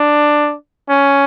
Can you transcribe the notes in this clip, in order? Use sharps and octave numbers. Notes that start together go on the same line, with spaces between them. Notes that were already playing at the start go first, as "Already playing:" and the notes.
Already playing: D4
C#4